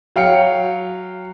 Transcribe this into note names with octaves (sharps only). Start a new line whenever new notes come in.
F#3 F5 G5 C#7